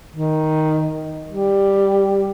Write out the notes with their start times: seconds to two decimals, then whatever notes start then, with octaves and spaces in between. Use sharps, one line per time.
0.15 D#3
1.29 G3